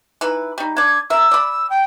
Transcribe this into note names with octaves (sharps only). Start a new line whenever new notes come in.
E3 D#4 B4
G3 D#4
D4 D5 G#6
A#4 E5 E6
D5 B5
G5